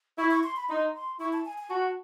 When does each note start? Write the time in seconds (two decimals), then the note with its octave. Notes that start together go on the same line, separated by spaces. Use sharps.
0.18 E4 C#6
0.31 C#6
0.43 C6
0.56 B5
0.69 D#4 C6
0.94 C6
1.20 E4 C#6
1.33 A5
1.45 G#5
1.58 G#5
1.70 F#4 A5